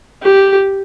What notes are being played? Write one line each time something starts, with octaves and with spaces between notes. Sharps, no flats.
G4